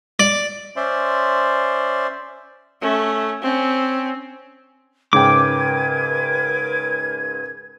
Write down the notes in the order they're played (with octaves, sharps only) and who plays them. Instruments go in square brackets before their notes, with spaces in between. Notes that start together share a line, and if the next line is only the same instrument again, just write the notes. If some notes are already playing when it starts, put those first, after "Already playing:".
[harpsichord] D5
[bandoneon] C#4 C5 D5 E5 C6
[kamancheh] A3 C#4
C4 C#4
[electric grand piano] G#2 C#3 G5 [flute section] A#4 B4 G#6 [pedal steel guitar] D6